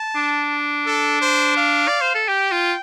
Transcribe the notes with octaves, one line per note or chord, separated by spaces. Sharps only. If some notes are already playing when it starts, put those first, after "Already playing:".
Already playing: A5
D4
A4
C5
F5
D5
C5
A4
G4 G5
F4